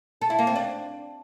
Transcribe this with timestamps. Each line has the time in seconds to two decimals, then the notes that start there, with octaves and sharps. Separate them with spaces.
0.21 A4
0.30 E4
0.39 A#3
0.47 C4
0.56 D4